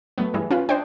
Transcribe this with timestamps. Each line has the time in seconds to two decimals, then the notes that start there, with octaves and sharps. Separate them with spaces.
0.18 F#3 A3 B3
0.34 G2 E3 G#4
0.51 C#4 F4 B4
0.69 D4 C5 D#5 G5